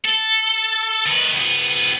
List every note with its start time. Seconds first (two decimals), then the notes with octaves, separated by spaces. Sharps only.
0.05 A4
1.06 D#3 B4
1.34 C#2 B3